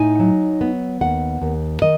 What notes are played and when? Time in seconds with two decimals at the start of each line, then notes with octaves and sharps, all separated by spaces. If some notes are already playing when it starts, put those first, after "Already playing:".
Already playing: A2 D#4 G#5
0.19 F#3
0.61 B3
1.01 D#2 F#5
1.42 D#2
1.82 D#3 D#5